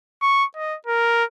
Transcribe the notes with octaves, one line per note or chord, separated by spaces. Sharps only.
C#6
D#5
A#4